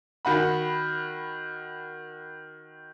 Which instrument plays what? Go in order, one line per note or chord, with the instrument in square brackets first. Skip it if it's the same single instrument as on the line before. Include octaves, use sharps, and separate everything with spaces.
[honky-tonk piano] D#3 F#4 B5